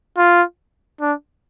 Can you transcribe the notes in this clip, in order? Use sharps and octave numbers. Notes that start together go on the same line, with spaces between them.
F4
D4